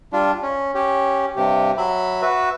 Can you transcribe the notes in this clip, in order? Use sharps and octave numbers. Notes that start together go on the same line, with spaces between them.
G3 D4 F4
C#4
C#4 G4
G2 C3 G4
F#3 E5 B5
F#4 B4 E5